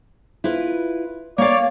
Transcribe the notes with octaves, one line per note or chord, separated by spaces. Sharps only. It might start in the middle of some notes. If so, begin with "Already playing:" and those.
E4 F4 B4
A#3 C#5 D5 F5